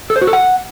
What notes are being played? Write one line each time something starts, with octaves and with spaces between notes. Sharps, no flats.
A4
C5
F#4
A4
F#5